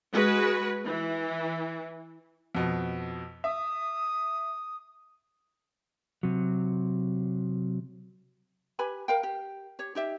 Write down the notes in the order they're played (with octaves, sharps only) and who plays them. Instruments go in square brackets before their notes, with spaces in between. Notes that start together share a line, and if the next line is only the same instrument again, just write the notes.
[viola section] G#3 F#4 B4
E3
[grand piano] F2 B2
[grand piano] E5 [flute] D#6
[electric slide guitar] C3 F#3
[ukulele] G4 B4 G#5 B5
A#4 F5 G5
G4
G4 C#5
D#4 G4 E5